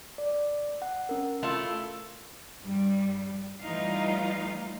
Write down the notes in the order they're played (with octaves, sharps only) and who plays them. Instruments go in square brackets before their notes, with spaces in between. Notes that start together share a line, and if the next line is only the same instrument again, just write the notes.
[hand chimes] D5
F#5
C#4 A#4
[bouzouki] A3 E4 F4
[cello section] G2 G3
E3 G3 A3 D#4 F4 F5